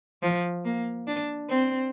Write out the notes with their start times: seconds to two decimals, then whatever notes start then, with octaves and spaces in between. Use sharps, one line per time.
0.22 F3
0.65 A#3
1.07 D4
1.50 C4